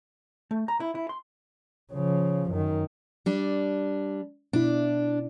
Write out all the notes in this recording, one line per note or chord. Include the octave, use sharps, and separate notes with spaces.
A3
A#5
E4
E4
C6
C#3 F3
F#2 D#3
G3 D4
B2 D4 E4